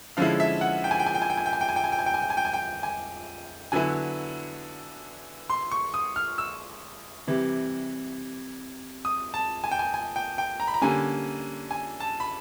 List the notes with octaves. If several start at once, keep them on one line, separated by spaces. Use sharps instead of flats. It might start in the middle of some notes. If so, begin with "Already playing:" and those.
D3 F3 G#3 C#4 E4 F5
E5
F#5
G5
G#5
G5
G#5
G5
G#5
G5
G#5
G5
G#5
G5
G#5
G5
G#5
G5
G#5
G5
G#5
G5
G#5
G5
G#5
G5
G#5
D3 F#3 B3 E4 G#5
C6
C#6
D#6
F6
E6
C3 E3 G3
D#6
A5
G#5
G5
G#5
G#5
G5
G5
A#5
B5
A#5
D3 G3 A#3 C#4 G#5
G#5
A5
B5